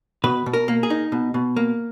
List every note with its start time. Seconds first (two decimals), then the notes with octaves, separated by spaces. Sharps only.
0.24 B2 B4
0.46 B2
0.53 A#4
0.68 A#3
0.83 G#4
0.90 D#4
1.12 B2
1.34 B2
1.56 A#3